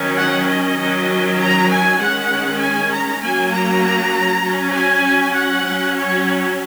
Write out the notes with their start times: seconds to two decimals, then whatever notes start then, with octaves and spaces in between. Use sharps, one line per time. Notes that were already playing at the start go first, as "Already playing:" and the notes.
Already playing: D#3 F#3 C#4
0.16 F#5
0.46 D#5
0.77 D#3 F#3 C#4
1.39 A#5
1.68 G#5
1.99 D#3 G#3 C#4 F#5
2.60 G#5
2.91 A#5
3.21 F#3 A#3 C#4 G#5
3.52 A#5
4.43 F#3 C#4
4.74 G#5
5.36 F#5
5.65 F#3 C#4
5.97 C#5